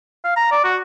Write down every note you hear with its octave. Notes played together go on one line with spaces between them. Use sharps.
F5
A#5
D5
F#4